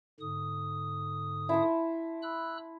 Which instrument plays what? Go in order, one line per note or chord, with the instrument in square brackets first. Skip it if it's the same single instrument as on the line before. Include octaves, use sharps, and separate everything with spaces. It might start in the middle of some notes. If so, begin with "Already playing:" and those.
[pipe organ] G#2 D3 D#6
[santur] E4 A5 C6
[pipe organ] B5 E6 F#6